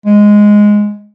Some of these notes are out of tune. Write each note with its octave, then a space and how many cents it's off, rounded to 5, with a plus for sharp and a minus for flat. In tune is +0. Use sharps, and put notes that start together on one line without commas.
G#3 +0